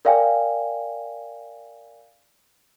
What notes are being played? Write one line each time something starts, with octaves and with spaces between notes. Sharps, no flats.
A#4 D5 F5 G5 G#5